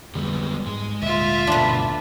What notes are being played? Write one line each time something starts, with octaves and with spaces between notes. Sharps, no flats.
F2 D3 G3 G#3 B3
G#2 G#3
D2 A#2 F4 E5
G2 B2 D4 B4 A5